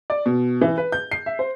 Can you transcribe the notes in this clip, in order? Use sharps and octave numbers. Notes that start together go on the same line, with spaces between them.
D5
B2
E3
B4
G6
C7
E5
C5